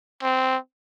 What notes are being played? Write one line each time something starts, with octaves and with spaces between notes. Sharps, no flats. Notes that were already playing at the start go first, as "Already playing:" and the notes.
C4